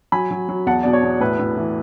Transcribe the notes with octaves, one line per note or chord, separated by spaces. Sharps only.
F#3 G#5 B5
F#3
F#3
E2 F#5 A5
B2 D5
C#5
E2
A2 B4
A2
E3